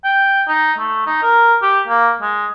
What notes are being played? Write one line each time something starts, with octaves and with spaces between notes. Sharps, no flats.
G5
D#4
A3
D#4
A#4
G4
A#3
G#3